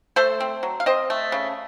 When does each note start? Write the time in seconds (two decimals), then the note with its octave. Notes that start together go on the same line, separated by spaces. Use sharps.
0.16 A3 A4 C5
0.40 C4
0.63 F#3
0.80 F5
0.86 C4 C5 D#5
1.10 A3
1.32 C#3